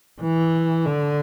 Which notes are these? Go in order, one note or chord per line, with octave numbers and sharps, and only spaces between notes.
E3
D3